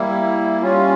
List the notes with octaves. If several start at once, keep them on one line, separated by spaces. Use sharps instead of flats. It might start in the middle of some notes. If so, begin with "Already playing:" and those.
Already playing: G3 A#3 E4
G3 C#4 F4